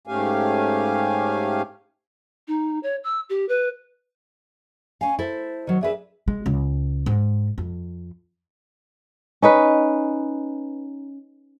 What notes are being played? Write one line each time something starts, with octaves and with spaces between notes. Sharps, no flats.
G#2 A3 C#4 G4 F5 G#5
D#4
C#5
E6
G4
B4
C#4 F5 G#5
E4 A4 C5
D#3 F#3
D4 G#4 B4 E5
G#3
C#2
G#2
F2
C#4 D#4 B4